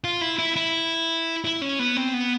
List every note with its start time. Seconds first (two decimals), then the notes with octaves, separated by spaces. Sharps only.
0.04 F4
0.21 E4
0.39 E4
0.56 E4
1.45 E4
1.62 C#4
1.79 B3
1.97 C4
2.14 B3